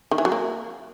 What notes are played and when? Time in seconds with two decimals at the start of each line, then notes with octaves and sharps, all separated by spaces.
0.11 D#3
0.18 E3
0.25 F#3
0.32 A#3